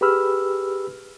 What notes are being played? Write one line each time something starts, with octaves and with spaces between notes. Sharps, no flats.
G4 G#4 B4 B5 E6 F6